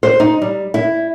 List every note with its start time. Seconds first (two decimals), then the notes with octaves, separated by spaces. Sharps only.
0.03 C5
0.20 D#4
0.42 G3
0.74 E4